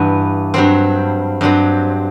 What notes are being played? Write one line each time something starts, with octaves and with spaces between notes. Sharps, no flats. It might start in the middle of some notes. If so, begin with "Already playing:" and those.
Already playing: G2 E3 B3
G2 F#3 C4
G2 F#3 C4